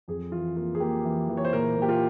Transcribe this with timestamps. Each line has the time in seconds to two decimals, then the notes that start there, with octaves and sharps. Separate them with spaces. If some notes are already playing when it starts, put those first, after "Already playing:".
0.08 F2 G#4
0.32 E3 F4
0.56 A#3 F4
0.75 G#4
0.80 A#3 G4
1.05 E3
1.29 E3
1.37 C#5
1.45 C5
1.53 A#2 A#4
1.77 A#2
1.82 G4
1.89 F4